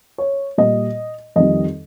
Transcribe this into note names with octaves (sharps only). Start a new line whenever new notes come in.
C#5
A#2 G3 D#5
F2 D#3 G3 D#5